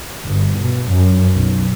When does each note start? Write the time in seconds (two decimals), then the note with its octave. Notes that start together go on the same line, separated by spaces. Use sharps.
0.24 G1
0.58 B2
0.88 F#2
1.35 B1